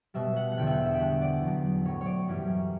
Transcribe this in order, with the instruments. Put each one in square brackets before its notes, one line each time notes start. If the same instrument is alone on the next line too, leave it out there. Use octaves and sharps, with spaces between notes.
[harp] B2 G3 E5
F#5
F#5
E2 D3 G3 G5
E5 F#5
E5
G5
B2 G3 F#5
D5
E2 B2 F#3
A2 F#3 C#5
C#5 D5
F#2 E3 G3